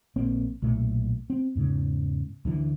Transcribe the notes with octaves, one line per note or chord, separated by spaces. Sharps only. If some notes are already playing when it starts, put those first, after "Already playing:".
A#1 A#3 C4
B1 A#2 A3
C4
E2 G#2 C#3
D2 D3 E3